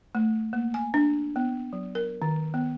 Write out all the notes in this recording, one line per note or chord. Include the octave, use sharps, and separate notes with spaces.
A3
A#3
G#5
D4
B3
F#3
A#4
D#3
B3